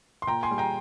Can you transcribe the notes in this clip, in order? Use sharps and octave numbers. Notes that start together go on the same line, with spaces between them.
C6
A#2 G5 A#5
G#5 C6
G3
G5 A#5